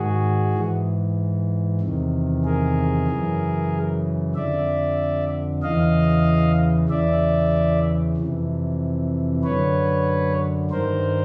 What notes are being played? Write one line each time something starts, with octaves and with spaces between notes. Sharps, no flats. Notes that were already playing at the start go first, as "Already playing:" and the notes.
Already playing: G#2 D#3 F#4 G#4
G#2 E3
E2 C3 D#3
G#4 A#4
F#2 C#3 E3
F2 D3 D5 E5
E2 C#3 E3 D#5 F5
E2 C#3 E3 D5 E5
F2 C3 E3
F#2 D3 B4 C#5
G2 D#3 A#4 C5